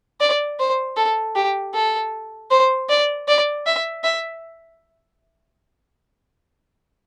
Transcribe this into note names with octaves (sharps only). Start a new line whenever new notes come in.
D5
C5
A4
G4
A4
C5
D5
D5
E5
E5